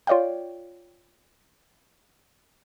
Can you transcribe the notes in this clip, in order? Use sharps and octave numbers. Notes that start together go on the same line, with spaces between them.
F4 C#5 D5 F5 G5